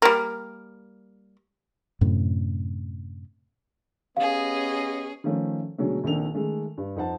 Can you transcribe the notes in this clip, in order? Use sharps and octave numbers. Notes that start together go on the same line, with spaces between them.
G3 A#3
F#2 A2 C3
B3 C#4 G4 G#4 D#5 F5
D#3 F3 A3 C#4
B2 D3 F#3 G#3 A3
A#1 D#3 C4 D4 A4 F7
D#3 G#3 A3
G2
F2 D#4 C5 F#5 A5